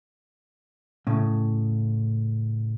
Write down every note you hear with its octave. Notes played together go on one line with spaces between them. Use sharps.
A2 C#3